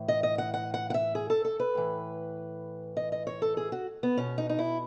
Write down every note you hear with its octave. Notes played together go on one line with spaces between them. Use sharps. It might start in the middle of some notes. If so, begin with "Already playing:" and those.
Already playing: A2 E3
D#5
D#5
F#5
F#5
F#5
F#5
E5
G#4
A4
A4
B4
A2 E3
D#5
D#5
C#5
A4
G#4
F#4
B3
B2 C#4
D#4
D#4
E4